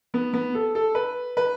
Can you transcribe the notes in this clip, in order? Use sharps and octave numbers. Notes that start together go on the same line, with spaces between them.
B3
B3
A4
A4
B4
B4